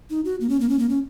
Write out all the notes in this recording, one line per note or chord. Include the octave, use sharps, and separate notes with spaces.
D#4
F#4
A#3
C#4
A#3
C#4
A#3
C#4